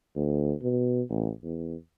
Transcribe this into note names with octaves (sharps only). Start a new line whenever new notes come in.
D2
B2
A1
E2